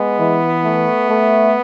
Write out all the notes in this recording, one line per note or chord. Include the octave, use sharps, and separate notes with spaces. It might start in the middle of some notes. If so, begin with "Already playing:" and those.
Already playing: G#3 B3
E3
A3
A3